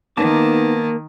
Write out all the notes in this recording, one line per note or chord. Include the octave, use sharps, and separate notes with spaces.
D#3 A#3 B3 D#4 A5 D6